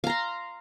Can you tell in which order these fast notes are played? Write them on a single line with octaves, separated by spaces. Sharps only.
F5 A#5 C6